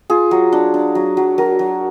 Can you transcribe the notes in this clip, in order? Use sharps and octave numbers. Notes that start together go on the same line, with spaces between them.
F4 G#4
F#3
D4
D4
F#3
F#3
F#3 A#4
F#3